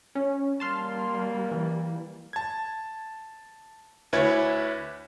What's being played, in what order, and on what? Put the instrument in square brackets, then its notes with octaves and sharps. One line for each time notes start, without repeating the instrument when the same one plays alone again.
[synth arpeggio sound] C#4
[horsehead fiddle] G3 A#3 [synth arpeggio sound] A5 C6 F6
[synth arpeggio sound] E3
[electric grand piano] A5 G#6
D2 E4 B4 C#5 G#6